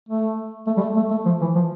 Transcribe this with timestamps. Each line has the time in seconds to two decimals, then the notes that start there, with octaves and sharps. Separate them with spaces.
0.09 A3
0.67 A3
0.77 G3
0.82 A3
0.97 A3
1.11 A3
1.26 F3
1.41 E3
1.55 F3